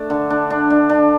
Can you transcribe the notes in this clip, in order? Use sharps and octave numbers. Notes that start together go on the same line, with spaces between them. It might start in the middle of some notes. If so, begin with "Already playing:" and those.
Already playing: A3 D4
D3
D4
D4
D4
D4